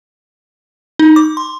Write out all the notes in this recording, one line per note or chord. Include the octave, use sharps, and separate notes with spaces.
D#4
D6
C6